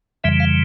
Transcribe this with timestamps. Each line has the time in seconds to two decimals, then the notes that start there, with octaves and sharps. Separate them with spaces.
0.24 F2 C#3 E3 G3 E5
0.40 F5